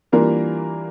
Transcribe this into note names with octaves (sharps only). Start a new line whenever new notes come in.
E3 G3 A#3 D4 F4 A#4